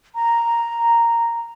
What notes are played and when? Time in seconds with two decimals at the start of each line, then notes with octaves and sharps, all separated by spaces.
0.15 A#5